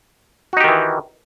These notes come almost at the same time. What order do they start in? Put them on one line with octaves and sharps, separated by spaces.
F#4 D#4 G4 D#3 E3